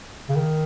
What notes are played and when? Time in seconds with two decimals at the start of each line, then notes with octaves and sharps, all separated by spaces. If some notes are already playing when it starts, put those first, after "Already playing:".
0.29 C#3
0.37 D#3